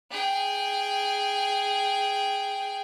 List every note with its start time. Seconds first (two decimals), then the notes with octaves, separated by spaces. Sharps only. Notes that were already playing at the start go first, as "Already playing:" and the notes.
0.11 G#4 G5